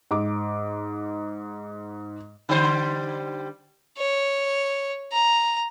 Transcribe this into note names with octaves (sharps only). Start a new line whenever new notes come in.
G#2 D6
D3 G3 C5
C#5
A#5